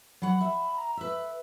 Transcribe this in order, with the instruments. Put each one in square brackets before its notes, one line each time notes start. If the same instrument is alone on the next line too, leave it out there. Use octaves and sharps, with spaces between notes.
[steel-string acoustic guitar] F#3 F#5 [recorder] B5
[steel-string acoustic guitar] E5
[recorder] A#5
[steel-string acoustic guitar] B4 E5 [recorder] E6